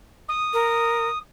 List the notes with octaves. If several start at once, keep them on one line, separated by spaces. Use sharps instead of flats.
D#6
A#4